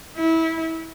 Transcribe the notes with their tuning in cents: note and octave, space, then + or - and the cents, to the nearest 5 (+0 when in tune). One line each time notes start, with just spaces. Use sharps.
E4 -20